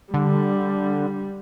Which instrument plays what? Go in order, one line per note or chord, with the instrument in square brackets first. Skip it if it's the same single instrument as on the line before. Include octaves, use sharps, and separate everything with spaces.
[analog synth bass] D3 [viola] G3